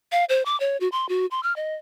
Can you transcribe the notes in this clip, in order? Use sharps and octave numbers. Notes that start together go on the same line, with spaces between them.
F5
C5
D6
C#5
F#4
C6
F#4
C6
F6
D#5